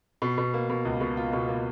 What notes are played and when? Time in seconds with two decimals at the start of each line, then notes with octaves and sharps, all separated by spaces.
0.22 B2
0.38 B2
0.54 A#3
0.70 B2
0.85 C#2
1.01 B2
1.17 F4
1.33 B2
1.48 A#3